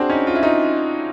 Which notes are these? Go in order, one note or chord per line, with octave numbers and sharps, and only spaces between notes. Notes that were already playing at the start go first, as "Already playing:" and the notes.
Already playing: C4 D4 F#4 G#4
C#4 D#4
F4
E4
D#4 F4